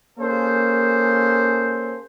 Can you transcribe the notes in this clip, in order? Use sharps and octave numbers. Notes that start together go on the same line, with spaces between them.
A#3 C#4 G#4 A4 C5